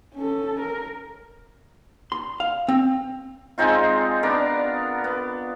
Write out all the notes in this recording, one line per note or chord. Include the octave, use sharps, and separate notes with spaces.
C#4 A4
A#4
C6
F5
C4
G#3 C4 D#4 F4
B3 D4 A#4
B3